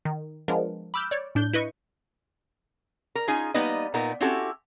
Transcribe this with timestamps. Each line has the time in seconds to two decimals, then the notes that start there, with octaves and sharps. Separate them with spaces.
0.05 D#3
0.48 F3 G#3 B3 D4 A#4
0.94 B5 D6 E6 F6 G6
1.11 C#5 D5
1.35 A2 D4 G6
1.53 E4 B4 D#5 C#6
3.15 A#4
3.28 C#4 D#4 F4 G#4 G#5
3.54 G3 A#3 B3 D#4 B4 D#5
3.94 A#2 B3 D#4 A#4
4.20 C4 C#4 E4 F#4 G4 A4